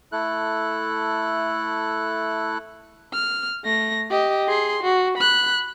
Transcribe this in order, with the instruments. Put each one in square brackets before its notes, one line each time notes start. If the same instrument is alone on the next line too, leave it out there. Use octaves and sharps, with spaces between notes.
[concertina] A3 E4 A4 F#6
[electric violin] F6
A3 A#6
G4 D#5
G#4 C6
F#4
B5 F#6